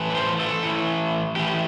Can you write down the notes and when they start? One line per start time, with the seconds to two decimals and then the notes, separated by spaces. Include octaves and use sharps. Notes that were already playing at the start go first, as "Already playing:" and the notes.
Already playing: A2 E3
0.10 B4
0.15 C5
0.40 A4
0.63 A2 E3
1.36 A2 E3 G4